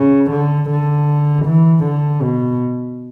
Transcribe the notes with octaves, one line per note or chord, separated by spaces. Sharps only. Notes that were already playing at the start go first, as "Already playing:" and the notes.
Already playing: C#3
D3
D3
E3
D3
B2